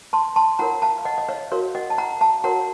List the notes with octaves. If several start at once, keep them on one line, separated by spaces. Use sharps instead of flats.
A5 C6
A5 C6
F4 A#4 C#5 F#5 A#5
F5 A5
F5
D#5 F#5
D#5
C#5 F5
F#4 A#4 C#5 F5
D#5 F#5
A5
F#5 A#5
F5 A5
F#4 A#4 C#5 F#5 A#5